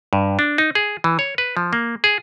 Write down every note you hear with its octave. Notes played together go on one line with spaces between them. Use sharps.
G2
D4
D#4
G#4
E3
C#5
B4
F3
A#3
G#4